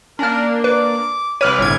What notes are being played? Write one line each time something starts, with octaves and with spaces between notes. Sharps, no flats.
A#3 C#4 D4 A#4 F6
B4 D6
C2 B4 C#5 D6 F6 D#7
G1 A2 C#5 G#6